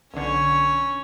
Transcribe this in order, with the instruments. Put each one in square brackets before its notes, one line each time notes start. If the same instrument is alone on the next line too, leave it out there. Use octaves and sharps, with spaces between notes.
[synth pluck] B1 D3 [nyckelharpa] C#4 C#5